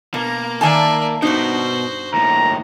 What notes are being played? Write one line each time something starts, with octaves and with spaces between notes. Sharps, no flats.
B2 A#3 A#5
D#3 D5 E5 G#5 A5
G2 B2 D#4 F#4 C5
D#2 A2 A#5